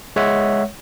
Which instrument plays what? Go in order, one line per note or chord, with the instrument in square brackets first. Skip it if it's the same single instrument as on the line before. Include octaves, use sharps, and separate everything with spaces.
[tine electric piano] G#3 C#5 E5 F#5